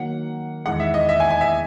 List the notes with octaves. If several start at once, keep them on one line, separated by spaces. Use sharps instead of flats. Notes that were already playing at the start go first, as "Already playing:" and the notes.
Already playing: D#3 F#3 A#3 F#5
E2 D#3 G#3 F#5
E5
D#5
E5
G#5
G#5
E5